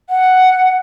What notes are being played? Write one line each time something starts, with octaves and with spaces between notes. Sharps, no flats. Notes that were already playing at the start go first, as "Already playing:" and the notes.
F#5